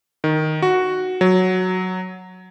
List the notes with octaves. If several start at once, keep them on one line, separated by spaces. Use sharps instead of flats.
D#3
F#4
F#3